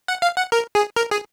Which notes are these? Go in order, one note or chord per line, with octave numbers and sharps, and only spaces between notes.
F#5
F5
F#5
A#4
G#4
A#4
G#4